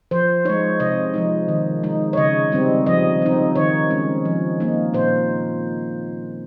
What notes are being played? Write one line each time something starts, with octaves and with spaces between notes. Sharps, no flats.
F3 C5
G#3 D#4 C#5
C3 D#5
F3 G#3 D#4
D#3
G#3 D#4
C#5
C#3 D#5
G3 C4 D#4
F3 D#5
C4 D#4
D#3 C#5
G#3 C#4
F3
A#3 D#4
A#2 C5